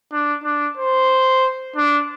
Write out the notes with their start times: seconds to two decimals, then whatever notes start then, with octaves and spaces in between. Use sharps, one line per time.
0.12 D4
0.44 D4
0.77 C5
1.76 D4